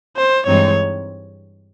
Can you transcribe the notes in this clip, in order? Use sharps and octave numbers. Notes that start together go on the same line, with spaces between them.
C5
G2 E3 G#3 C4 D#4 C#5